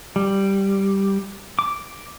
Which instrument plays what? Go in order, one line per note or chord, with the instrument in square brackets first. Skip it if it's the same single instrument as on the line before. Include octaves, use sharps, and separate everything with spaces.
[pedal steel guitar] G3
D6